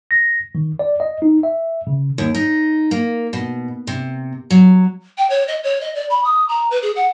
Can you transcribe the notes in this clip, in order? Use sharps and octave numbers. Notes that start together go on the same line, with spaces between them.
A#6
D#3
D5
D#5
D#4
E5
C#3
D#2
D#4
A#3
B2
C3
F#3
G5
C#5
D#5
C#5
D#5
D5
B5
D#6
A#5
B4
G#4
F#5